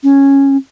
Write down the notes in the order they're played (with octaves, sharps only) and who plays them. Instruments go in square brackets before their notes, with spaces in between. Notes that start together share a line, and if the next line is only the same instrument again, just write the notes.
[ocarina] C#4